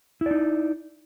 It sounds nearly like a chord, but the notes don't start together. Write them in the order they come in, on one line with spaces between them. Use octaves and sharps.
E4 D5 D#4